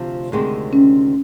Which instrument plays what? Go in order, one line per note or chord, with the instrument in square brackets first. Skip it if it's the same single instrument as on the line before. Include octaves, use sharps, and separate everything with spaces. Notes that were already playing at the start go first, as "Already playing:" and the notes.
Already playing: [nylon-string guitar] D2 C3 F3
D2 C3 D#3 G#3 C4
[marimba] C#4